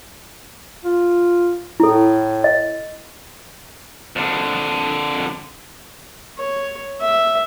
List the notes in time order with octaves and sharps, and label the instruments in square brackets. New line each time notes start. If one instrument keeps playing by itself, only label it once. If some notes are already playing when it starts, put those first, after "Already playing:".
[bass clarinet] F4
[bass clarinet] A2 [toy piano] E4 A4
[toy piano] D#5
[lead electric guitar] F2 D3
[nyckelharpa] C#5
E5